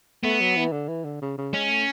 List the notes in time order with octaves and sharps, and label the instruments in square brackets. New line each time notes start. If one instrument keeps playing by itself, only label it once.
[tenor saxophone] A3 [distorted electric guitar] B3
[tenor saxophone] F#3
E3
D3
E3
D3
C#3
C#3
[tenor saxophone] G#3 [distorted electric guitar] C#4
[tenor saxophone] A3